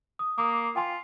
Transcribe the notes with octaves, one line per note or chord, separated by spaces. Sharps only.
D#6
A#3 D6 D#6
F4 G5 G#5 C6